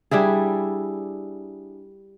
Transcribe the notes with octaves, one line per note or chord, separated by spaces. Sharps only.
G3 D4 E4 G#4